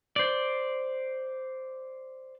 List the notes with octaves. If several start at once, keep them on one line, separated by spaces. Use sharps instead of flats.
C5 D5